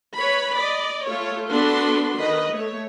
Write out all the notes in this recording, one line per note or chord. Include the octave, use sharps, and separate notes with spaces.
B4 C#5 B5
D5 D#5
A3 F4 A4 C#5
B3 D4 F#4 A4 B4 C6
D#3 B4 D#5
A3 C#5